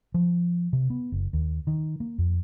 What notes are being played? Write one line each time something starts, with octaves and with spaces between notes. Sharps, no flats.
F3
C3
B3
F#1
D#2
D#3
A#3
F2